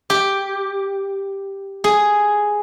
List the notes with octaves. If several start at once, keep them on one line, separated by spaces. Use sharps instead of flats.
G4
G#4